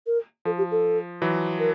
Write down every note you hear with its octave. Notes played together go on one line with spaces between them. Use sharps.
A#4
F3 A4
G4
A4
E3 F#3
A#4